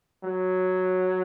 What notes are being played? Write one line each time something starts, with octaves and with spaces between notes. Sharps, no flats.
F#3